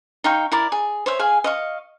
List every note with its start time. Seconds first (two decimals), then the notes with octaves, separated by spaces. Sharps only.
0.24 D#4 F5 G5 C#6
0.52 E4 A#4 D5
0.72 G#4
1.06 C5 C#5 E5
1.19 G#4 F5 G#5
1.44 D#5 F5 C#6